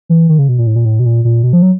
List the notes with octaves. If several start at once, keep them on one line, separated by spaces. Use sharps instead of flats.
E3
D#3
C#3
B2
A#2
A2
A#2
A2
B2
A#2
A#2
B2
F3
F#3